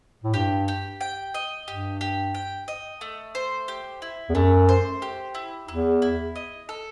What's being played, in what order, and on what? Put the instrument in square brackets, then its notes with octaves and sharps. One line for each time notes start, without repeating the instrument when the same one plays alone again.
[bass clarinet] A2
[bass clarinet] G2 [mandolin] G4
[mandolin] G4
G5
D#5
[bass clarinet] G2 [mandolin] G4
[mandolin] G4
G5
D#5
A3
C5
G4
E4
[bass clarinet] E2
[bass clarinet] F#2 [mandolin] A3
[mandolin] C5
G4
E4
[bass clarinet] E2 [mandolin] E4
[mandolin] E4
D#5
A4